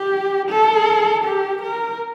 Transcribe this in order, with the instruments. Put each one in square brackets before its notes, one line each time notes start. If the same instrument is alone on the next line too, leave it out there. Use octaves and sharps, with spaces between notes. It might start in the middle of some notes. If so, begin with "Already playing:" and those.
Already playing: [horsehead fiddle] G4
A4
G4
A#4